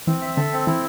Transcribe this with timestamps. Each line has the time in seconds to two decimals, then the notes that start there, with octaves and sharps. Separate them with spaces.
0.07 E3 C4
0.22 E5
0.37 D3 A4
0.52 C4
0.67 E3 E4